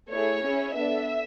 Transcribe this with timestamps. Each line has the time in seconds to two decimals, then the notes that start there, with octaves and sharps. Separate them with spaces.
0.11 A3 E4 G#4 C#5
0.43 C#4 E4 G#4
0.76 B3 D4 A4 E5